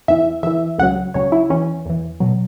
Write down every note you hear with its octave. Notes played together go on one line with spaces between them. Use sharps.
E2 E3 E5
E2 E3 E5
C#2 C#3 F#3 F#5
C#2 C#3 F#3 C#5
E4
E2 E3 C#4
E2 E3
B2 F#3